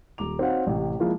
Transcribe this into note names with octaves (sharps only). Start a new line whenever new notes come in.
D#1 A#5 D6 F7
C4 D#4 F#4 C#5 F5 F#5
A1 C3
F3 G#3 A#3 E4 F4